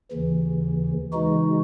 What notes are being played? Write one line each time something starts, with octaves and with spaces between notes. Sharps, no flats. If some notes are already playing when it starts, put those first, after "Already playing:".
D#2 C#3 E3
C#3 E3 G#3 D#4 F#4